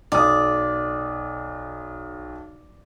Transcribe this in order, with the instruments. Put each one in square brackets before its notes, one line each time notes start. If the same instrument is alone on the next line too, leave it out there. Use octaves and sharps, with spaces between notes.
[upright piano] B1 D#6 [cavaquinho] D5